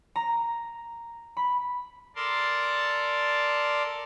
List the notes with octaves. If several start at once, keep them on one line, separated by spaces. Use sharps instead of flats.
A#5
B5
A4 A#4 D5 A5 C6